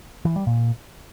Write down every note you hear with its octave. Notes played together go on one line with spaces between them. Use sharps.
E3
G3
A#2